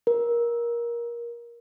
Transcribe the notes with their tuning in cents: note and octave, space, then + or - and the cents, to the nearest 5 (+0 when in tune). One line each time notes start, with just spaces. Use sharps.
A#4 +20